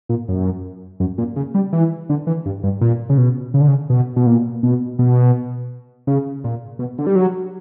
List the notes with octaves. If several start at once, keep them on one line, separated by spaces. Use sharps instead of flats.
A#2
F#2
F#2
A#2
C#3
G3
E3
D3
E3
G2
G2
A#2
C#3
B2
C#3
D3
C#3
B2
B2
A#2
B2
B2
C#3
A#2
B2
D3
G3
F#3